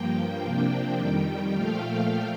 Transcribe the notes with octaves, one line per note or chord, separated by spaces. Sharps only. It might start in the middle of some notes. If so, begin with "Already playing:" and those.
Already playing: G2 F3 A#3 G5
C3 F3 A#3 D4
F2 D#3 G3
A#2 F3 A3 F5